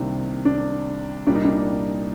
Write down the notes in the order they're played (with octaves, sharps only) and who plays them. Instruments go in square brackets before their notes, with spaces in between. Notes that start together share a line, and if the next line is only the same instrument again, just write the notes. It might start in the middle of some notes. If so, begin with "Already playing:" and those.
Already playing: [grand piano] C2 C3 D#3 A#3 D4
D4
C2 A#2 G3 A#3 D4
D#4
D4